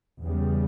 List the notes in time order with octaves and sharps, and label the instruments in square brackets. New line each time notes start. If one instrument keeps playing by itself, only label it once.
[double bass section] E2 C#3 G3